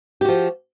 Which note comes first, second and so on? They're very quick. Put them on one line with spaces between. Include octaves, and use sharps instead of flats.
G4 F#4 F3